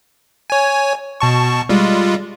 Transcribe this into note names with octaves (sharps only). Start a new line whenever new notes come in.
C#5 G#5
B2 A5 C#6
G3 G#3 F4